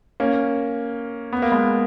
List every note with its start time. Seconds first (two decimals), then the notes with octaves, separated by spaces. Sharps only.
0.20 A#3 C#4
1.33 B3
1.42 A#3
1.52 G#3 B3